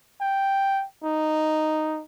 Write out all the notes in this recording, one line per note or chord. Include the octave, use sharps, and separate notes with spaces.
G5
D#4